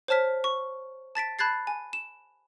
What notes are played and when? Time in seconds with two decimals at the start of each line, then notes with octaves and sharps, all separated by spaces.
0.08 C5 C#5 A5 F6 B6
0.44 C#6
1.15 A5 A6 B6 D7
1.39 A5 B5 F#6 G#6 A6 C7
1.67 G#5
1.93 E7